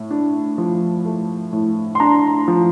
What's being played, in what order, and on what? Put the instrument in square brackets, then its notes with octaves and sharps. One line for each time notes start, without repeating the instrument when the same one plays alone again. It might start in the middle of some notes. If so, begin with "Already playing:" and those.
Already playing: [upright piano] A2
D4
F3
A3
A2
C6
D4 A#5
F3